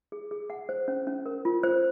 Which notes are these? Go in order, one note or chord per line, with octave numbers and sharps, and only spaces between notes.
G#4
G#4
F#5
C5
C#4
C#4
A#4
F4
C5